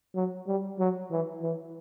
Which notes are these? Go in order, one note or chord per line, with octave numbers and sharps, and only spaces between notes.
F#3
G3
F#3
E3
E3